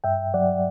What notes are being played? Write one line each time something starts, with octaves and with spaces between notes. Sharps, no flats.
G2 E5 G5
F#3 D5 F#5